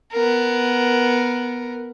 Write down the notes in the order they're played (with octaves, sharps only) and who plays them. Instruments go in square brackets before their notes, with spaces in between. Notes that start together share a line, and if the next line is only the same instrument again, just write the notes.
[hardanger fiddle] B3 A#4